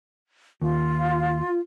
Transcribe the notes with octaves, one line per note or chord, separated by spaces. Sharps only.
D#2 F4